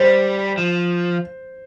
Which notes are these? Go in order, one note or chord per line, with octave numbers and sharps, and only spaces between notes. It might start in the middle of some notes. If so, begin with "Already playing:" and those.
Already playing: G3 C5
F3